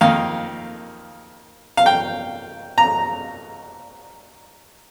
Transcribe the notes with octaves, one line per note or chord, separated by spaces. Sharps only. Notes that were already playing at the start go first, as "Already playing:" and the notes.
F2 D#3 A#3 F5
F5
G5
A#5